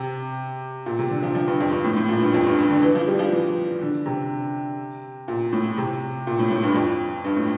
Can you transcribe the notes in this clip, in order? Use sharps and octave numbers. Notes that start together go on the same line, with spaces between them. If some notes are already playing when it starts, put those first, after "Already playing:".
Already playing: C3
A#2
C3
D3
F3
F3
G2
F2
G2
A2
A2
A#2
G2
F2
G2
G2
D3
E3
F3
G3
F3
E3
D3
C3
A#2
A2
C3
A#2
A2
A2
G2
F2
G2
A2